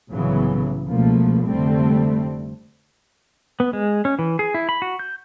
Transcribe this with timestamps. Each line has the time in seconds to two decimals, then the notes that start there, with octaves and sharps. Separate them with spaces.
0.12 C2 A2 C#3 E3 F#3 B3
0.87 C#2 B2 F3 A3 A#3
1.45 F1 D3 G3 A3 C4
3.60 B3
3.73 G#3
4.05 C#4
4.19 E3
4.39 G#4
4.54 E4
4.69 B5
4.82 F#4
4.99 G6